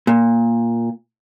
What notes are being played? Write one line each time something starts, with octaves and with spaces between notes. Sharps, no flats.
A#2